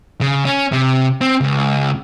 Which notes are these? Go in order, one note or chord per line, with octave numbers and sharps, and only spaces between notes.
C#3
C#4
C3
C4
C#2